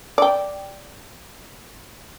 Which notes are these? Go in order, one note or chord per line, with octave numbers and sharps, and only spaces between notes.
D5 G5